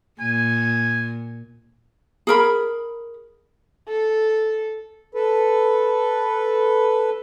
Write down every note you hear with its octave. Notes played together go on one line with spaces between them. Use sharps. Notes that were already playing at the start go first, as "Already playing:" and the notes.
A#2 G#5
G#4 A#4 B5
A4
A4 B4